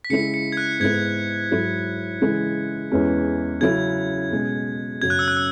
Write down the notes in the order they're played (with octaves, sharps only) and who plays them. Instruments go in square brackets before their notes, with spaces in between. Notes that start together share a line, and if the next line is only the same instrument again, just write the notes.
[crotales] B6
[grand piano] C#3 G#3 E4 [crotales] C#7
[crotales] C#7
G#6
F#6
[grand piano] G#2 G#3 B3 E4 [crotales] G#6
[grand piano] G#2 F#3 E4
C#3 E3 G#3 E4
E2 E3 G#3 C#4
[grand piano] C#3 F#3 C#4 E4 [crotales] G#6
[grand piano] B2 G#3 C#4
[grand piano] F#2 C#3 F#3 [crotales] G#6
[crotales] F#6
E6
F#6
E6